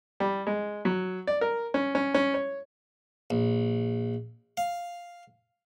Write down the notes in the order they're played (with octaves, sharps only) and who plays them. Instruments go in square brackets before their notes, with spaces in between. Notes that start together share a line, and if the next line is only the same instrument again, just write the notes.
[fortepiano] G3
G#3
F#3
D5
A#4
C#4
C#4
C#4
C#5
[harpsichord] A#1
F5